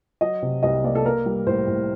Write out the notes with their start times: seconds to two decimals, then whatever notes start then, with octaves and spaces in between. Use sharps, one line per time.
0.21 F#3 D#5
0.42 C3
0.63 C2 D#5
0.84 A#3 D5
0.95 A4
1.05 A#3 A#4
1.26 G3
1.47 A2 C5
1.68 A2